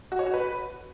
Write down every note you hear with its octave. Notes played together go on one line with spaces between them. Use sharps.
F#4
C#5
F#4
B4